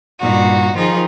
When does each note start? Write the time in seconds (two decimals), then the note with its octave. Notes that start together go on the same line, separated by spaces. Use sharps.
0.19 G2 A#2 D#4 F#4
0.76 D#3 F3 D#4 F4 G#4